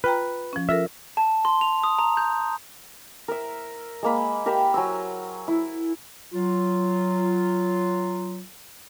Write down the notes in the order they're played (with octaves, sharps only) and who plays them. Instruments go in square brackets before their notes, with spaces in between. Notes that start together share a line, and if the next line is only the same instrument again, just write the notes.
[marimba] F4 G5 A#5 [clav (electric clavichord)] B4
[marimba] F3 C#4
[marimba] F4 A4 A#4 [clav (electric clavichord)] E5
[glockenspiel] A5
C6
F7
D#6
A#5
G6
[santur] A#4 E5
G#3 A#3 B5
G4 A#4 E5 B5
F#3 G#5 C6 E6
E4
[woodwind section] F#3 F4